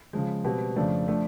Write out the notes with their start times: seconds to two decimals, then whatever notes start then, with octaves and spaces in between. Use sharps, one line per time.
0.13 C#3 F3 G#3
0.45 B2 G3 C4
0.76 F2 C#3 F3 A3 D4
1.07 F3 A3 D4